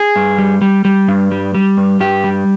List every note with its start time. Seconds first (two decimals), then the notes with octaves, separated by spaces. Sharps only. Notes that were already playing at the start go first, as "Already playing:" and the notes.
Already playing: G#4
0.16 G2
0.38 G3
0.62 G3
0.85 G3
1.08 G2
1.31 G3
1.54 G3
1.77 G2
2.00 G2 G4
2.24 G3